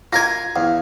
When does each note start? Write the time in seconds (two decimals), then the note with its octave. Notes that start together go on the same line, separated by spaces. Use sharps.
0.13 F4 A#4 G#5 G#6 A#6
0.56 E2 F5